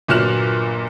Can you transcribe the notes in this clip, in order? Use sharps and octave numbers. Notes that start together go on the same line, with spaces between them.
G1 A#2 F#3 F6 F#6 E7